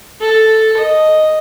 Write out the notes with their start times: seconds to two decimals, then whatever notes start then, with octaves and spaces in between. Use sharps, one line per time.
0.22 A4
0.78 D#5